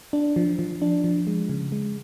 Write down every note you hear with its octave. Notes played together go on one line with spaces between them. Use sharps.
D4
F3
F3
D4
F3
G#3
C#3
G#3